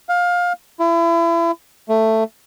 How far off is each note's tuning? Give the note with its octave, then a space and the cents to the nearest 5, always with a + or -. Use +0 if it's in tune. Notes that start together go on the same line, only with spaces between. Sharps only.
F5 +20
E4 +35
A3 +10